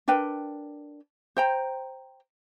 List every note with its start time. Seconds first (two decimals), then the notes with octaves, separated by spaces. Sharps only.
0.08 D4 A#4 B4 G5
1.37 C5 G5 A#5